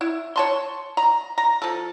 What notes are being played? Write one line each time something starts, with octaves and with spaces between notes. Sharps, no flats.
E4
C#5 A5 C6
A#5
A#5
F3 A4